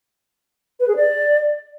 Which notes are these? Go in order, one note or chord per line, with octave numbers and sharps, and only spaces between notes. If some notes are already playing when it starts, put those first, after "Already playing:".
B4
G#4
D5